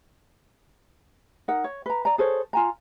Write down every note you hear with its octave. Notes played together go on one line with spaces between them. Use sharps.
D#4 A#4 F#5
C#5
B4 A#5
D5 A#5
G#4 A4 C5 C#5
F4 G#5 A#5